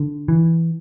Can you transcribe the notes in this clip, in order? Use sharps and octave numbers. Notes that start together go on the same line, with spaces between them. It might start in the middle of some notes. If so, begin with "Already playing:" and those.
Already playing: D3
E3